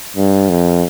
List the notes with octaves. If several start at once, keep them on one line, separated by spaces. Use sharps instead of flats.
G2
F2